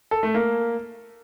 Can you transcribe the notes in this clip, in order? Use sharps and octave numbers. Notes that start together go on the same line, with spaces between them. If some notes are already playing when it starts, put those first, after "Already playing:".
A4
A3
A#3